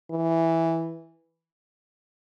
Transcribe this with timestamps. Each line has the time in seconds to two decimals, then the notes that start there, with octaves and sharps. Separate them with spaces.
0.11 E3